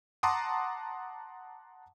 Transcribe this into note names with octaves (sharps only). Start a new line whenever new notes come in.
F#5 A5 A#5 C6 D6 D#6